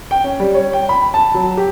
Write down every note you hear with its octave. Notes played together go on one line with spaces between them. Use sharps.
G5
C#4
G3
C#5
G5
B5
A5
F#3
G4